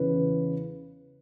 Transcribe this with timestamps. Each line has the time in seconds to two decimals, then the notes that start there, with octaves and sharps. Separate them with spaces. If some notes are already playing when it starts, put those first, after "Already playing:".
Already playing: E2 C#3 E3 B4